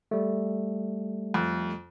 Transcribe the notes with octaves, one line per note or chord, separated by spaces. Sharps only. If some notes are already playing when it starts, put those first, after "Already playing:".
G3 A3
F2